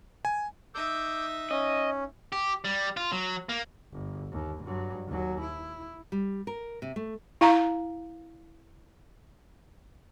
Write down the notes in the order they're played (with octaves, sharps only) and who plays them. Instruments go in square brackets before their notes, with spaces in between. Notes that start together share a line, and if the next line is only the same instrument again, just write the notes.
[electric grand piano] G#5
[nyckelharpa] D#4 E5 [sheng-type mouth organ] D6 E6 G6
[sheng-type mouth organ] C#4 [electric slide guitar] D#5
[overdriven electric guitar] G4
G3
F4
F#3
A#3
[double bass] G1
D#2
G2 F#3
D#2 F#3
E4
[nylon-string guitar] G3
A#4
C3
A3
[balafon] E4 F5 A#5